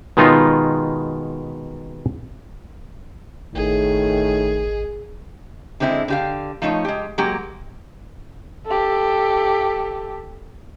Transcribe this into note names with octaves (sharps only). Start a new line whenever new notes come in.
B2 D#3 G#3 B3 D#4 F4
G#1 A2 D#3 G#4
D3 G#3 C4 D#4 E4
D3 G4 F5
F3 A3 D#4 C#5
G#3 G4
F#3 G#3 A#3 G4
G4 A4